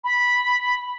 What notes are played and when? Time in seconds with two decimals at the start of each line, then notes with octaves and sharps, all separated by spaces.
0.04 B5